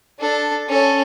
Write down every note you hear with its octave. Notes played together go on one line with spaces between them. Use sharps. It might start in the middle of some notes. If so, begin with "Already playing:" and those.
D4 A4
C#4 A4